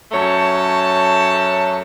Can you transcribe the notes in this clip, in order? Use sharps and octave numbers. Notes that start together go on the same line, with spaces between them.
F#2 A3 C#5 A5